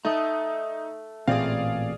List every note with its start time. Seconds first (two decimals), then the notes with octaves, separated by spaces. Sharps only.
0.05 A3 D#4 D#6
1.28 A1 A#2 C4 G#4 D5 F5